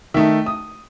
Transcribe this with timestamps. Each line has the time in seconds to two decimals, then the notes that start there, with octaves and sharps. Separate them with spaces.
0.14 D#3 A3 D#4 E5
0.46 D#6